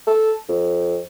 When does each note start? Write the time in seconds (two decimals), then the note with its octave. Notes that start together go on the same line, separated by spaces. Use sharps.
0.07 A4
0.49 F2